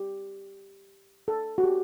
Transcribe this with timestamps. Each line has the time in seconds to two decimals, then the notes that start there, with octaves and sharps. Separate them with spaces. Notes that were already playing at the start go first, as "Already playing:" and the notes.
Already playing: G4
1.28 A4
1.58 F#4
1.64 G4